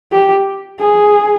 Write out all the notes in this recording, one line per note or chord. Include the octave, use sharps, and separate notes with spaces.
G4
G#4